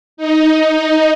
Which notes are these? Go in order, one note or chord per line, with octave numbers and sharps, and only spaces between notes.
D#4